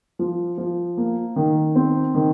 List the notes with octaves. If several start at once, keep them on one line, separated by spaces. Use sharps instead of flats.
F3
F3
A#3
D#3
C4
D#3